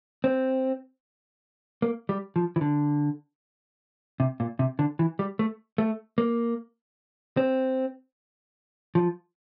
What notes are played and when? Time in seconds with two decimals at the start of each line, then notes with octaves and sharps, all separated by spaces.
0.24 C4
1.82 A#3
2.09 G3
2.36 F3
2.56 E3
2.61 D3
4.20 C3
4.40 A#2
4.59 C3
4.79 D3
4.99 E3
5.19 G3
5.39 A3
5.78 A3
6.18 A#3
7.37 C4
8.95 F3